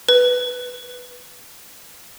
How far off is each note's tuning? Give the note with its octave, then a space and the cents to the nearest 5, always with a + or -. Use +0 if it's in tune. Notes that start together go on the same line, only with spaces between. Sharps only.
B4 +0